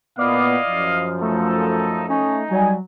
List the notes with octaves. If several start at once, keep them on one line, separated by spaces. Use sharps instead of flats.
A#2 B3 E4 D5 D#5 F5
F#2 F3
A3 D#4 A4
C#4 D#4
F#3 G3 G#5